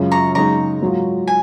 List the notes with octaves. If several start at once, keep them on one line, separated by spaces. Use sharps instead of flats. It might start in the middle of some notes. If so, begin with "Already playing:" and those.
Already playing: F#2 C#3 G#3 C#4 F4
A#5 C#6
F#2 C#3 G#3 D#4 G#4 A#5 C#6
G#2 F#3 A#3 F4
G#5